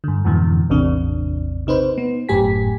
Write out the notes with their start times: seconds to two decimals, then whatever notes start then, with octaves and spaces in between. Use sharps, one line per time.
0.04 G2 D3
0.25 F2 G#2 B2 D3 E3
0.70 A1 E2 C3 D4
1.67 C3 D#4 B4 C5
1.98 B3
2.29 G1 F#2 A2 G4 G#5 B6